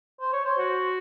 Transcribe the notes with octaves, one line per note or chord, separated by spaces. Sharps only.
C5
C#5
C5
F#4